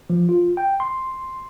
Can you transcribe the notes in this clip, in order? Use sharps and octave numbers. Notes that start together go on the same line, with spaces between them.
F3
F4
G5
C6